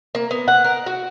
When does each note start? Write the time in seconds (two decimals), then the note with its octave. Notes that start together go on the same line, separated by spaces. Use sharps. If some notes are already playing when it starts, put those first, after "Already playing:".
0.15 A#3
0.31 B3
0.48 F#5
0.64 A#4
0.86 F#4